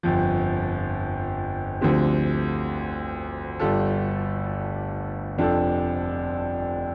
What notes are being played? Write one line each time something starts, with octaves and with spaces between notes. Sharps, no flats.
G1 F2 F3
D2 D3 F3 C4 G4
G1 G2 G3 F4 A4
F1 F2 F3 D4 A4